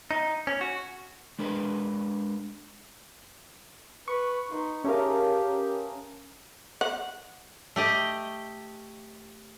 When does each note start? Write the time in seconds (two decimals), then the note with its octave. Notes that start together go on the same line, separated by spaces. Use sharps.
0.11 D#4
0.47 C#4
0.61 F#4
1.39 G#3 D4 A#4 B4
4.08 B4 C#6
4.51 D#4 B4 C6
4.84 A3 C#4 G4 G#4 A#4 F5
6.81 F#5
7.76 A3 G4 D#5